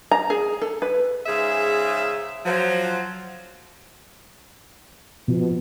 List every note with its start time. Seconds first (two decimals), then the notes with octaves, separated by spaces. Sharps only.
0.12 A#5
0.30 G#4
0.62 A4
0.82 B4
1.26 G#2 C#3 G#4 E5
2.45 F3 F#3
5.28 B2 F3